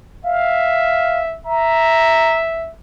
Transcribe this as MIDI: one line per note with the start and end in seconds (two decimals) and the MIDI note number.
0.25 1.36 76
0.25 1.22 77
1.46 2.71 76
1.46 2.38 82